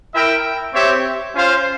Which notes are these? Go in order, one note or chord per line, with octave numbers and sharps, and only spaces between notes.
E4 A#4 E5 G5
C4 G4 C#5 E5
C#4 F4 C5 F5